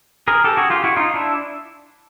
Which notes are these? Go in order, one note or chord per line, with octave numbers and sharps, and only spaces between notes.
G#4 A#4
G4 A4
F#4 G#4
F4 G4
E4 F#4
D#4 F4
D4 E4